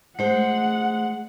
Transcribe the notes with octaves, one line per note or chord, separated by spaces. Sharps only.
G#3 A3 C5 F#5